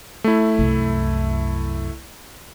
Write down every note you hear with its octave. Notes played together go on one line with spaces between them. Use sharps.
A3 E4
C2 F#2